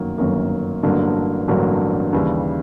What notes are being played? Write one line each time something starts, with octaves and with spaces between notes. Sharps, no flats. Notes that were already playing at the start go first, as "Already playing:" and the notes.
Already playing: G1 F#2 D#3 F#3 A#3
G1 F#2 D#3 F#3 A#3
A1 G2 D3 F#3 A#3
A1 G2 D3 F#3 A#3
D#2 C#3 E3 G3